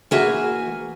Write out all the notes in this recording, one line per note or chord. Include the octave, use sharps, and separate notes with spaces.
E3 A#3 F#4 G#4 E5 G#5